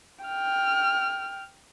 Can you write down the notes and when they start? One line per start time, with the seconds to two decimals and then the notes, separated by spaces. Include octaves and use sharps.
0.25 G5 F6